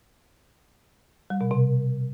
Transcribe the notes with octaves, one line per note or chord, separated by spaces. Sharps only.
G3
B2
C3